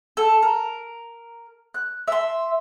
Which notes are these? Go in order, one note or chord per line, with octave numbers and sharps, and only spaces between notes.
A4
A#4
F#6
E5 C6